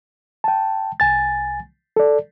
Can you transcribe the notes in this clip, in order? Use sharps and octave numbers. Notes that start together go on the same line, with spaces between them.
G5 A5
C2 G#5 A6
A4 D5